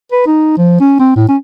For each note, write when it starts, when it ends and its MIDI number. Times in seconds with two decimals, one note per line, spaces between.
0.12 0.24 71
0.27 0.56 63
0.58 0.80 53
0.80 0.96 61
1.00 1.15 60
1.16 1.28 45
1.29 1.37 61